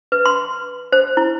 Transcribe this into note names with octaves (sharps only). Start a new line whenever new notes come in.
B4
C6
C5
E4